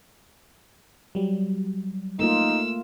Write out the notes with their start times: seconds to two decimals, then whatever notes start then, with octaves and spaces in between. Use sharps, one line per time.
1.15 F#3 G3
2.19 A3 A#3 D#4 F4 E6